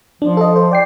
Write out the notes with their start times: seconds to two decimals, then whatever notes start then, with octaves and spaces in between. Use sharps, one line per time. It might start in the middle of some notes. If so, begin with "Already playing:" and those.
0.22 F3 D4
0.37 A4 D#5
0.56 C5
0.71 D5 G5 C7